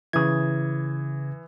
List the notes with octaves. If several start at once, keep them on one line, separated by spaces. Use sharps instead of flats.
C#3 E3 D#6 G#6